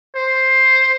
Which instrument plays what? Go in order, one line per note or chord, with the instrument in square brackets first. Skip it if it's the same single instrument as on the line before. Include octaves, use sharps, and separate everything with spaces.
[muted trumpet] C5